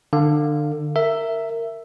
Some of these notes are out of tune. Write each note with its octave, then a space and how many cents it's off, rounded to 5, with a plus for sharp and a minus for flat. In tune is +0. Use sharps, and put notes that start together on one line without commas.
D3 +30 F5 +0
A#4 -15 E5 +5